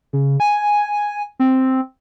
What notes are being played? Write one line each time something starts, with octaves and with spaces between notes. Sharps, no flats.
C#3
G#5
C4